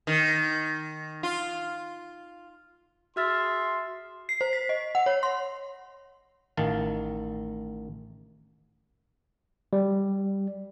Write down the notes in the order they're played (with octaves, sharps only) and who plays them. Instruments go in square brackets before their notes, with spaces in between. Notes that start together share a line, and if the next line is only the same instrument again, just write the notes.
[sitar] D#3
F4
[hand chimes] F#4 F6 A6 [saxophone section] G#4 E5 [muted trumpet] C6
[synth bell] C7
C5
B6
D#5
F#5
C#5
C6
[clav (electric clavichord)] A1 D#3 F5 A5
[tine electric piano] G3